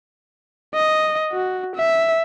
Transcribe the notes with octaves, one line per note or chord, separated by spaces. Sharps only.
D#5
F#4
E5